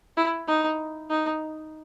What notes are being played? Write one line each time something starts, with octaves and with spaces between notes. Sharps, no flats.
E4
D#4
D#4